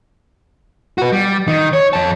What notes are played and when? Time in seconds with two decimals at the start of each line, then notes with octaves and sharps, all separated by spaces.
0.98 F#4 B4
1.13 G3
1.48 D#3
1.73 C#5
1.93 F2 A5